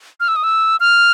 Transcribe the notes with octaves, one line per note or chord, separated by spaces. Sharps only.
F6
E6
D#6
E6
F6